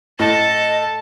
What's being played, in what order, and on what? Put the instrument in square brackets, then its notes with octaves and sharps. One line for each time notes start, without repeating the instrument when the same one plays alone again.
[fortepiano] A2 [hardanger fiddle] A4 A5 [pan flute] D#5